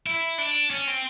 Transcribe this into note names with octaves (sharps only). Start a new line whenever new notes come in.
E4
D4
C#4
C4